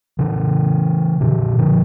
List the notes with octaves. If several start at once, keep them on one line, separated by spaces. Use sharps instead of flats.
C#3 E3
A#2 D3
D3 F3